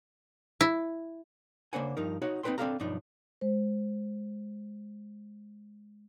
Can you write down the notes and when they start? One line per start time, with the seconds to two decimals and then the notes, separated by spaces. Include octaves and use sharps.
0.61 E4
1.73 C#3 A#3 D4 C5 F#5 G#5
1.97 G2 F3 D#4 A#4
2.22 D#4 F#4 C#5 F#5
2.43 C4 D#4 A4 B4 G5 C6
2.58 C4 D4 F4 A4 F5 A#5
2.80 B1 G2 F3 D4 D#4
3.41 G#3 C5